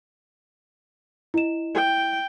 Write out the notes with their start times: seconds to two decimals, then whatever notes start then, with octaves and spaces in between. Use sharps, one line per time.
1.34 E4 D#5 E7
1.74 G5